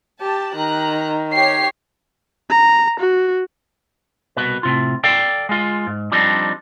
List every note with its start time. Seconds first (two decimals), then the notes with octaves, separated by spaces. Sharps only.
0.21 G4 A5
0.56 D#3 A#5 F#6
1.33 G4 C#5 C7
2.50 A#5
3.00 F#4
4.37 C2 B2 B4
4.63 A2 C3 F4
5.04 A4 D5 F5 G5
5.49 G#3 F4
5.87 G#2
6.12 F3 G3 C4 D4 D#4